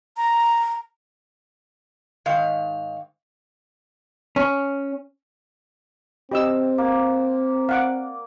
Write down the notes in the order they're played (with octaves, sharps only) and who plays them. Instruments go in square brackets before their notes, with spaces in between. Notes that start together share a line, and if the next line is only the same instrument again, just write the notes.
[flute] A#5
[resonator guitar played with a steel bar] G#2 D#3 F5
[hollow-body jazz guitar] C#4
[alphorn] C4 [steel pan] G4 D#5 E6
[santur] A#3
[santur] D5 [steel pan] F5 F#5 D6